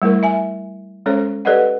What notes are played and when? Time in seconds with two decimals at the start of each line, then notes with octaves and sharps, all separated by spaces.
0.02 G3 A3 E4 A#4
0.23 E5 G#5
1.06 G#3 C#4 A4 C5 C#5
1.45 G4 A4 B4 D5 D#5 F#5